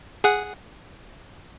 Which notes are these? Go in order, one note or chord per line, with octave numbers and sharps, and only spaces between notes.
G#4 F#5